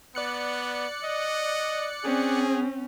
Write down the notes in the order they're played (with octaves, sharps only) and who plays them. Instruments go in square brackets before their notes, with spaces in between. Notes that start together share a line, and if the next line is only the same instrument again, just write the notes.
[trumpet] B3 [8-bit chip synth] D5 F#6 C#7
[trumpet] D#5
[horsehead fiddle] C4 C#4 [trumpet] G#4